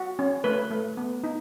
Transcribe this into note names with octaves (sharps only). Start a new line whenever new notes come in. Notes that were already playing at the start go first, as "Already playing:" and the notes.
Already playing: F#4
C#4
A3 B4
A3
B3
D#4